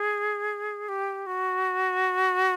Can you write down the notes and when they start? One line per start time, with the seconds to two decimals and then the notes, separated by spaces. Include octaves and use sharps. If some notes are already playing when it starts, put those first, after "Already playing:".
Already playing: G#4
0.89 G4
1.26 F#4